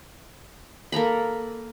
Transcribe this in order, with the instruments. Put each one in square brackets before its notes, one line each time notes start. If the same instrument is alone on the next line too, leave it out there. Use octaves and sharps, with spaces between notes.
[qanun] A#3 A4 A#5 B5